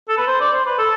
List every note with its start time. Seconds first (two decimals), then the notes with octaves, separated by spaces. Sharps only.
0.09 A4
0.18 B4
0.27 C5
0.40 D5
0.53 C5
0.66 B4
0.78 A4